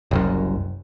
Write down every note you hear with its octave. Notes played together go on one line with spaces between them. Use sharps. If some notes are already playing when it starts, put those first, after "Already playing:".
F#1 C2 F#2